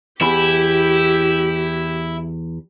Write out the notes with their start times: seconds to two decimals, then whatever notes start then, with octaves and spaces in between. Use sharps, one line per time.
0.21 E2 E4 G4 B5